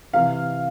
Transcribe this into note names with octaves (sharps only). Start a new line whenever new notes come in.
C3 E3 F5